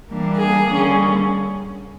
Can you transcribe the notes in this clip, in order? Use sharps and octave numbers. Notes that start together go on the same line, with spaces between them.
E3 G3 A#3 D4
G#4
D3 G3 A#3 C#4